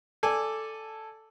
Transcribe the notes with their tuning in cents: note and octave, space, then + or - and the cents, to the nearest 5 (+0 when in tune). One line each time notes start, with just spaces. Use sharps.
A4 +0 D5 +0 G#5 -10